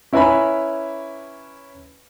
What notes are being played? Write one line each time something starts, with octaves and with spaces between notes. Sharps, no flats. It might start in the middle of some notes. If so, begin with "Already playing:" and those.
C#4 E4 B4 G#5 A#5 B5